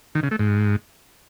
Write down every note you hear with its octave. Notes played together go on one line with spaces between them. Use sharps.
D#3
C#3
A3
G#2